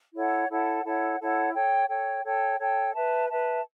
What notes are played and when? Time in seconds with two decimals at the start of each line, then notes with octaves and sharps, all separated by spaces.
0.14 E4 A4 C#5 F#5
0.49 E4 A4 C#5 F#5
0.84 E4 A4 C#5 F#5
1.19 E4 A4 C#5 F#5
1.54 A4 C#5 G5
1.89 A4 C#5 G5
2.24 A4 C#5 G5
2.59 A4 C#5 G5
2.93 B4 E5 A5
3.29 B4 E5 A5